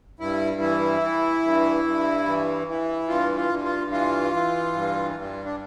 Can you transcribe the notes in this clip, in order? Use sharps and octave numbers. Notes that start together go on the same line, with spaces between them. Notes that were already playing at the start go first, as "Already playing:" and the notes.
G2 E4
E3 E4
E3
G2
G2
E3
E3
G2 F4
F4
G2
F4
E3 F4
E3
G2
G2
D4